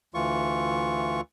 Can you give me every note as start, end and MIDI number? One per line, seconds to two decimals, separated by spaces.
0.14 1.21 38
0.14 1.21 52
0.14 1.21 65
0.14 1.21 85